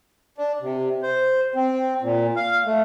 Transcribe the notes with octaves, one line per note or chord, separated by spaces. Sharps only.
D4
C3
C5
C4
A#2
F5
A3